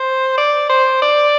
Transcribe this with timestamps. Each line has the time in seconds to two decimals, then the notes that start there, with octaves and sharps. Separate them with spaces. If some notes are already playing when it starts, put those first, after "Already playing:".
Already playing: C5
0.38 D5
0.70 C5
1.02 D5